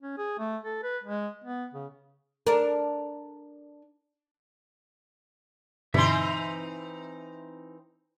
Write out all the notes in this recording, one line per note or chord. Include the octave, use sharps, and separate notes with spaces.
C#4
G#4
A3
A4
B4
G#3
B3
C#3
D4 A#4
G2 B2 D3 E3 C4 D#4 E5 C6